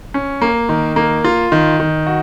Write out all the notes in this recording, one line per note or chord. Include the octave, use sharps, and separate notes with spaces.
C#4
A#3
D#3
A#3
F4
D#3
D#3
F#4